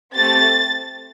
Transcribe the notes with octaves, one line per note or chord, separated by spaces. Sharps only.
A3 C4 G4 A6